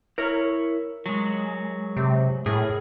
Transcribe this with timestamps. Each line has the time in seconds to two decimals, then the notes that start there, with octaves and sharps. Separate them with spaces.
0.18 E4 A#4 C#5
1.06 F#3 G#3
1.97 C3
2.46 A2 G#4 A#4